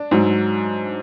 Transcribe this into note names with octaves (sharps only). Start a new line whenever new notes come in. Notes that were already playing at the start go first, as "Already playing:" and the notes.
Already playing: D4
G#2 F#3